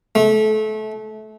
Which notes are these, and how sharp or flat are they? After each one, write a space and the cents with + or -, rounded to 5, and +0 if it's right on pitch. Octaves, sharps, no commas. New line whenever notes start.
A3 -30